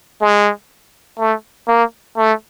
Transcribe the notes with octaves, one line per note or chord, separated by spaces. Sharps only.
G#3
A3
A#3
A3